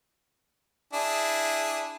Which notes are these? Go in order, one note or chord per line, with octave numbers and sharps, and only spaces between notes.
D4 E4 G#4